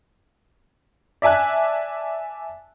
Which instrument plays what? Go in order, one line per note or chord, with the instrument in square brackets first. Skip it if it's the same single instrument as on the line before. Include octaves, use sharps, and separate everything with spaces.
[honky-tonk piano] D5 E5 G#5 A5 F#6